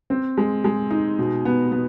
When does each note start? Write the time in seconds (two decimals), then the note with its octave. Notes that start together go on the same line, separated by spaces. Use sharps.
0.10 C4
0.38 G#3
0.64 G#3
0.91 D#4
1.19 B2
1.45 B3
1.72 B3